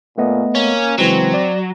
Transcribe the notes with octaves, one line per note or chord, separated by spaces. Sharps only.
A#2 A3 B3 D#5
A#3 C#4
C#3 E3 F#3 G#3 C4
D5